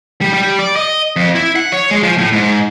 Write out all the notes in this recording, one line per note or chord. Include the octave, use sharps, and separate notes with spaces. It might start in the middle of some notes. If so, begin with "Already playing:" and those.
G3
G3
D5
D#5
F2
E4
F#5
C#5
G#3
F3
A2
G#2